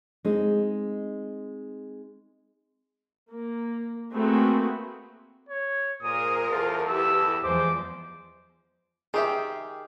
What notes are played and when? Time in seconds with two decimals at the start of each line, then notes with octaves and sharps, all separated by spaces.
0.25 G#3 C4 D#4
3.31 A#3
4.13 A3 A#3 C4 F#4 G#4 B4
5.49 C#5
6.02 A#2 G#4 A#4 C5 D#6
6.51 E2 F4 A4
6.89 E4 G4 B4 E6
7.43 E2 F3 G#3 C5 D6
9.14 D#3 G4 G#4 E5